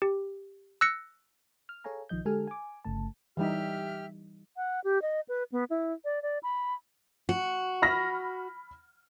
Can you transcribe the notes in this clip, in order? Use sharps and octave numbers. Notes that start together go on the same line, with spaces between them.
G4
E6 F#6 A#6 C#7
F6
G#4 A4 C#5 F5 G#5 A#5
B1 D#3 F3 D#5 G6
D3 G#3 G4 A4 G#5 F6
G#5 D6
G1 C#3 A3 A5
E3 G3 D#4 G4 E5 F6
F#5
G4
D#5
B4
B3
E4
D5
D5
B5
F#4
B5 F6 A#6